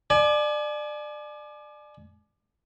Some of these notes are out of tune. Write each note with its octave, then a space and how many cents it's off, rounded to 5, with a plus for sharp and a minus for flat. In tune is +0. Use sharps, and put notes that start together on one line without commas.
D5 +25 G#5 +40